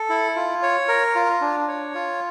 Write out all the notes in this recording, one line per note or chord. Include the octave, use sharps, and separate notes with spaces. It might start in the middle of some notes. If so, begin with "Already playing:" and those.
Already playing: A4
E4
F4
C#5
A#4
F4
D4
C#5
F4